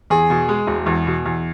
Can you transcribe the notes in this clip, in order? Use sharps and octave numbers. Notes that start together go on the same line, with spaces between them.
E2 G#4
B2
G#3
E1
E2
B2
E2